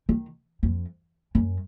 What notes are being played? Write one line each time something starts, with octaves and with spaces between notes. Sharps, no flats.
D#3
F2
F#2